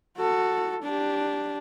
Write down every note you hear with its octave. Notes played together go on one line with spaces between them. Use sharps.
F#4 A4
D4 G4